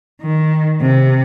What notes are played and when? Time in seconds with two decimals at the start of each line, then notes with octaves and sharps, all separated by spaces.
0.22 D#3
0.80 C3